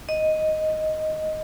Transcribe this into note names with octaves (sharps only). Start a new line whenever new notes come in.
D#5